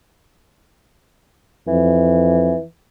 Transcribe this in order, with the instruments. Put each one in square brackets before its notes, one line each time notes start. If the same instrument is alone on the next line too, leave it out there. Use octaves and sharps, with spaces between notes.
[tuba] F2 [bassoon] E3